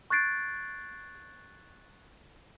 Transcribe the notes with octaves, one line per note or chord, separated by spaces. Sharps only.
C#6 F#6 G#6 A6 C7 D7